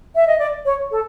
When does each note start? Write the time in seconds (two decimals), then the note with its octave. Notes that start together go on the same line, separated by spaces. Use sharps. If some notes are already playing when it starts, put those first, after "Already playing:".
0.15 E5
0.27 D#5
0.39 D5
0.65 C#5
0.91 A4